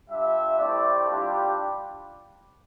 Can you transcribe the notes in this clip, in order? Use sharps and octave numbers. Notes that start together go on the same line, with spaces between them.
G3 D4 F4 E5
A3 C4 E4 G4 D5
G3 D4 F4 G4